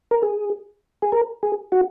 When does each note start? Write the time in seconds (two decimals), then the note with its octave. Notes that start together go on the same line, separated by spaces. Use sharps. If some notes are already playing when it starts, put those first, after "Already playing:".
0.11 A#4
0.23 G#4
1.02 G#4
1.12 A#4
1.43 G#4
1.72 F#4